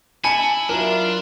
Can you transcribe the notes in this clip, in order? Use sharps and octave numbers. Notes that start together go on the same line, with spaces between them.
E4 G#5 A5 B5 C#7
F#3 D4 E4 F4 A#4